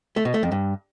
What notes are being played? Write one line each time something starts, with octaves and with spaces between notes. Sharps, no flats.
A3
B2
A3
F2
G2